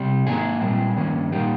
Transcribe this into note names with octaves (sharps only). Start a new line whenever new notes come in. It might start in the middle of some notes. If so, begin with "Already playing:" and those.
Already playing: C3 G3 C4
G#2 D#3 A#3 G#4
A#2 G3 C4
G2 D#3 A#3 C#4
A#2 G3 A#3 D#4 G4